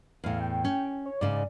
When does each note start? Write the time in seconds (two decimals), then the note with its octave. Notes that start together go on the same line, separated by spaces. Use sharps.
0.24 E2 A2 F5
0.40 G5
0.64 C#4
1.06 C#5
1.21 G#2 C#3 D5